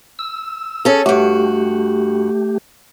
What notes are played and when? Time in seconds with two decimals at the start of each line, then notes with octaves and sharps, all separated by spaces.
0.19 E6
0.85 C#4 G#4 A4
1.06 G2 A3 F#4 G4